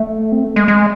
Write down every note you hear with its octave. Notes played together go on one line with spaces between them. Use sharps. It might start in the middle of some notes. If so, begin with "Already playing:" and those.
Already playing: A3
C4
A3
G#3
G#3